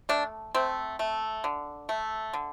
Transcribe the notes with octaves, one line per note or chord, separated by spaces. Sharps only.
A3 D4
A3 C4
A3
D3
A3
D3